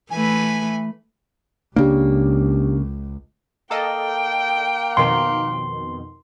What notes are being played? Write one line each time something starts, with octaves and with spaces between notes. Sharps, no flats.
E3 A3 B4 G#5
C#2 C#3 A#3 D4 G4
A#3 A4 D#5 G5
F2 B2 D#3 C6